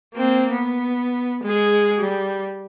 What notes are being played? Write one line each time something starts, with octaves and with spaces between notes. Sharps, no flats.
A#3 C4
B3
G#3 G#4
G3